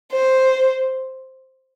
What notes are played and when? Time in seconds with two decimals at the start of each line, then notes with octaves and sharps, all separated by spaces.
0.12 C5